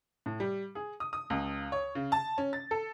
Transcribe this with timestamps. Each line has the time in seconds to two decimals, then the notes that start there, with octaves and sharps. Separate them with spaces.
0.26 A2
0.40 G3
0.75 G#4
1.00 D#6
1.13 D#6
1.30 C#2
1.72 C#5
1.95 C#3
2.12 A5
2.38 C#4
2.53 A6
2.71 A4